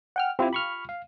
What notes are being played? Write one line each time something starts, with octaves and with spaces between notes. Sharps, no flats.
F#5 G5 F6
C4 E4 F4 G4
B5 C#6 F6
F5